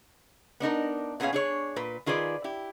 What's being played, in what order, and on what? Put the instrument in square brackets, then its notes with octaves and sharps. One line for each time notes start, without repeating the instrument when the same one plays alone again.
[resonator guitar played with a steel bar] B3 D4 D#4 A#4
A#2 B3 C#4 G#4 C#5 F5
D4 G#4 C#5
A#2 B4
D#3 F4 G#4 B4 D5
E4 G4